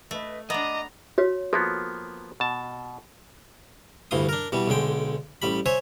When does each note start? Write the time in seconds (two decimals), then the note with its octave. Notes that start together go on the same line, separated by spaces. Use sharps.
0.11 A3 B4 D#5
0.50 B3 D4 D#5 E5 A#5 D6
1.18 F#4 C#5
1.53 F3 A#3 B3 A4
2.40 B2 A5
4.11 D2 G2 E3 C6 D#6
4.29 D4 A#4
4.52 B2 E3 G3
4.68 B1 D3 G#3 G5
5.42 A1 G3 B5
5.66 C5 C#5 E5 G#5